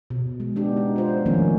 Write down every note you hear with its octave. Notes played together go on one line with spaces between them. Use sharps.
B2
G#3
B3 D4 G4
D#4
F4 C5
D#3 F3 A3 A#3 C#4